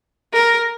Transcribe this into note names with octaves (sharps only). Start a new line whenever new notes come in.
A#4